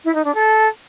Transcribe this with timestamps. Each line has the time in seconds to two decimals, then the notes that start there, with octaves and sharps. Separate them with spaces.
0.05 E4
0.15 D#4
0.24 D4
0.34 A4